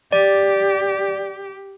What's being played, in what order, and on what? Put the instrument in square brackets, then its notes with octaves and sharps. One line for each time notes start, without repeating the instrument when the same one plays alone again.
[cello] G4 [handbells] D5